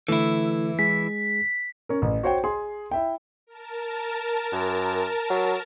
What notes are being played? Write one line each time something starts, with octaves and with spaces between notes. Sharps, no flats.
D3 E3 A3 E4 A4
G#3 G#4 B6
C#4 A#4
A1
F#4 C5 C#5 F#5 G5
G#4 C6
E4 E5 G5
A#4 A5
F#2
F#3